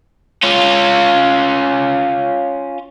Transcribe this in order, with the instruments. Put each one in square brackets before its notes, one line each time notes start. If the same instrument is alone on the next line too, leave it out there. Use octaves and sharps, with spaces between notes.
[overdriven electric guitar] C#4 F4